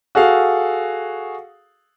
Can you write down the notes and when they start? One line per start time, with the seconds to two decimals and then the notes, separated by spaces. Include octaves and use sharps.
0.15 F#4 G#4 A4 F5